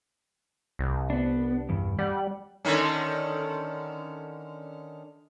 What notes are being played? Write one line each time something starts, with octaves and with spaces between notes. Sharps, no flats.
C2
B3 D4
E2 G2
G3 D5 F#5
D3 D#3 C#4